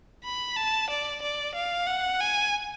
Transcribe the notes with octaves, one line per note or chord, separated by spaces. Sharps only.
B5
A5
D5
D5
F5
F#5
G#5